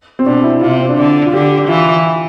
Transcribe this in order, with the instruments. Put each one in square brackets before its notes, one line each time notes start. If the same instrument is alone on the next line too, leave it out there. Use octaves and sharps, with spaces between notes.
[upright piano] C4
[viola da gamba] B2 [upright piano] D4
[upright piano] E4
[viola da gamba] C3 [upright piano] F4
[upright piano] C4
D4
[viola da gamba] D3
[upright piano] F4
[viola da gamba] D3 [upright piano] G4
[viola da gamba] E3 [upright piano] F4